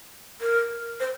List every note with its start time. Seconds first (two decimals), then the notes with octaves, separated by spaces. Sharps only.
0.41 A#4
1.00 C5